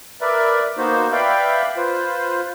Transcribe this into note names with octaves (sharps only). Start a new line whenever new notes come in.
A#4 B4 D5 E5
A#3 B3 D#4 F#4 C5
B4 D5 E5 F5 G5 B5
F4 B4 C5